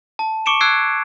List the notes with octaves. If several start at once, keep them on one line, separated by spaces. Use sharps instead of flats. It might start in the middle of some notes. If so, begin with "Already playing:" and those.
A5
C#6 D6 C#7 D7 E7
E6 F#6 G#6 C7 D7